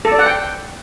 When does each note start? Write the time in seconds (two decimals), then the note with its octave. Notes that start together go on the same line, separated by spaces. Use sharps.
0.05 A4
0.12 D5
0.19 F#5
0.26 G5